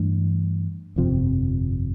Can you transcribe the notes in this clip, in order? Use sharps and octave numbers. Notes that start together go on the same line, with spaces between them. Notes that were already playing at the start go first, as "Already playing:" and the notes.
Already playing: G2 E3 A3 D4
G1 F2 C3 F3